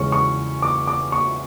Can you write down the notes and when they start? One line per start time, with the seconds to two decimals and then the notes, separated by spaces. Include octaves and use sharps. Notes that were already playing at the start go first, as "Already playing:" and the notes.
Already playing: E2 C#3 G#3 C#4 C#6
0.12 C#6
0.62 D6
0.87 D6
1.12 C#6